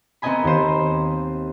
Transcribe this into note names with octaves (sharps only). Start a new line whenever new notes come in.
B3 C4 A#4 D#5 G#5 B5
D#2 C5